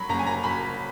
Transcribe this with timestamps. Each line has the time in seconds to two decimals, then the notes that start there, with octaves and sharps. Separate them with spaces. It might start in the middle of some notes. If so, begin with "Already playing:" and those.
Already playing: F#3 B5 C#6
0.09 F#1 A#5
0.19 G#5
0.27 A#5
0.44 F#1 B5